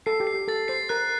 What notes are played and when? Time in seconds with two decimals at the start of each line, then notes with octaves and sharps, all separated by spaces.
0.06 A4 C7
0.20 G4
0.27 C7
0.34 G4
0.48 A4 A6
0.68 C5 C7
0.89 A#4 F#6